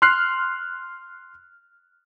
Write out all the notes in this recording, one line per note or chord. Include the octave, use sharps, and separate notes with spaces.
C6 F6 F#6 C7